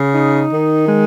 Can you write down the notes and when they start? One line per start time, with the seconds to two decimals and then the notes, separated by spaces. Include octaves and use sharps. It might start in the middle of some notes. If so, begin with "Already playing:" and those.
Already playing: C#3
0.14 D#4
0.52 D#3
0.88 G#3